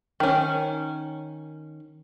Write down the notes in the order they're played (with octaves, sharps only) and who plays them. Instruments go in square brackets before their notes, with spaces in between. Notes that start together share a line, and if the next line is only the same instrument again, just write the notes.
[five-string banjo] D#3 C#4